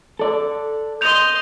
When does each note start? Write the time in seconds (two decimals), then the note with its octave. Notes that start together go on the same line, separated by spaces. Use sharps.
0.19 A4 D5
1.01 D#5 C6 G6 F7